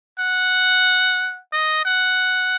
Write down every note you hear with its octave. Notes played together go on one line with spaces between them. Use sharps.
F#5
D#5
F#5